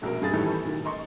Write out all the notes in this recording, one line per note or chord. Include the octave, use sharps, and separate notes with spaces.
E1 A#1 B2 A#3 A#4
G2 G#4 A6
A2 D#3 E3 G3 A3 G4
B1 D#3
D#5 A#5 C6 C#6